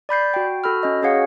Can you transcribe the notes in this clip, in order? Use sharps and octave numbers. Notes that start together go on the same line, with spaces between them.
D5 B5 G6 C7
F#4 G5
F#4 A4 B5 F6
C#4 D#5
C#4 F#4 G#4 C#5 F5 F#5